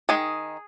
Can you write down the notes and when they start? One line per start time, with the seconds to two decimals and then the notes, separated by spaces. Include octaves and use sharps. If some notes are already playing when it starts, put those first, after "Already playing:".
0.09 D#3 G#3 G#4